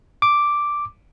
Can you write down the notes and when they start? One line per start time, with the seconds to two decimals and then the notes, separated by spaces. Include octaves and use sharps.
0.22 D6